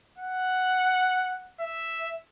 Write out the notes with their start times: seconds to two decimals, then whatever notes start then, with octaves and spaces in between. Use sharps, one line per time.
0.19 F#5
1.60 E5